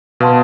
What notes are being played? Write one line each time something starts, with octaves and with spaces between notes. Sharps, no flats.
B2 B4 F5 A5 C6